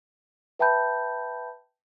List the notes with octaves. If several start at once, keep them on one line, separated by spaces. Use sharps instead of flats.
B4 E5 G5 A5 B5 G6